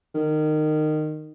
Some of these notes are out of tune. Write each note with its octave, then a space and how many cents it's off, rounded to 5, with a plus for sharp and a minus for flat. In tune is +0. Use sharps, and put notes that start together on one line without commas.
D#3 -20